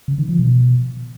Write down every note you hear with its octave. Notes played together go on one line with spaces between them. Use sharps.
C#3
D#3
F3
B2